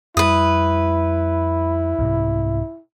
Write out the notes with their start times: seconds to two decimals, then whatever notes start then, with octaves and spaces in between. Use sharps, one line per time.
0.17 F2 G3 E4 B4 D#6
1.99 C2 G#2 C3